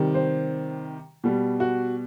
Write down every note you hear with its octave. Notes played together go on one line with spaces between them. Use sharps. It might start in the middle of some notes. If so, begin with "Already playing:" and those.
Already playing: C3 D#3 G3
C5
B2 G3
F#4